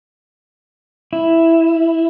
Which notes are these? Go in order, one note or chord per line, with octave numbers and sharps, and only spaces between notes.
E4